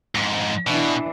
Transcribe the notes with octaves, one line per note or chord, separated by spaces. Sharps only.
F2 G#2
B2 E3 D4